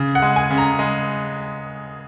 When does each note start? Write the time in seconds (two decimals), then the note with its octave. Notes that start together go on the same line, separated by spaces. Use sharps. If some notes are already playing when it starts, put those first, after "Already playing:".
Already playing: C#3
0.15 F#5
0.22 G#3
0.36 G#5
0.51 C#3
0.58 A#5
0.79 G#3